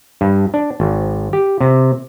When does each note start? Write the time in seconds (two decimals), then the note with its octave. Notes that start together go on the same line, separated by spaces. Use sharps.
0.21 G2
0.54 D4
0.80 G#1
1.33 G4
1.61 C3